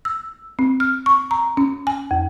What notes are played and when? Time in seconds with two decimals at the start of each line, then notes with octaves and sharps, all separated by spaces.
0.05 E6
0.59 C4
0.80 F6
1.06 C#6
1.31 A#5
1.57 C#4
1.87 G#5
2.11 F2